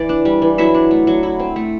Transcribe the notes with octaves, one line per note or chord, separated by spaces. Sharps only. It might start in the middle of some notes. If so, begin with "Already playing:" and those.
Already playing: E3 D5
D4
G3
E3
F#3 E4 E5
D4
A3
F#3
E4
C4
A3